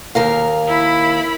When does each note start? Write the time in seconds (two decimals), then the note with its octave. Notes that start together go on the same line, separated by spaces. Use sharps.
0.15 D#2 A#4 F5
0.67 E4 B5